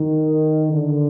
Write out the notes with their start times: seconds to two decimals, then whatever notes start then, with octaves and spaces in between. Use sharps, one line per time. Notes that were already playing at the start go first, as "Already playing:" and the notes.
Already playing: D#3
0.72 D3